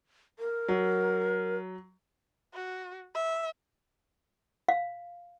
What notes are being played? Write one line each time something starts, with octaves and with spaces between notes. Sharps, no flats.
A#4
F#3
F#4
E5
F5